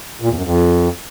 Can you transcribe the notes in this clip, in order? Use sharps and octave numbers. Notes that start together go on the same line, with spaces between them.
A#2
E2
F#2
F2